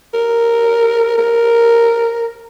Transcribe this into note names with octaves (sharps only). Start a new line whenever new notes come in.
A#4
A#4